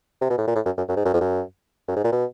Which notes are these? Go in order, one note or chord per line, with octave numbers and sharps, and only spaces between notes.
C3
B2
A2
A#2
A2
F#2
F#2
F#2
G#2
F#2
F2
F#2
F#2
G#2
A#2
B2